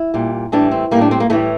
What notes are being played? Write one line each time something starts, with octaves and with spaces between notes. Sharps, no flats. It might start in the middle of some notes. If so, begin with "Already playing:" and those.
Already playing: E4
A#2 G3
A2 E3 G3 D4
C4
A2 G3 A#3
D4
C4
A#3
A2 E3 G3 A3